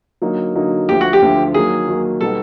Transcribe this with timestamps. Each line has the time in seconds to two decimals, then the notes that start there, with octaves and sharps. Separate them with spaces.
0.22 D3 F#3 A#3 D#4
0.55 D3 F#3 A#3 D#4
0.88 D2 D3 F3 G4
1.01 F#4
1.13 G4
1.22 D2 D3 F3
1.54 D#3 F#3 A#3 G#4
1.88 D#3 F#3 A#3
2.21 B2 G3 B3 D#4 F#4 A4